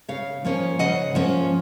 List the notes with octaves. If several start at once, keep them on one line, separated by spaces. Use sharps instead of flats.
C#3 C#5 F5
F3 A#3 C#4
C#3 D#5 F#5
F3 A#3 C#4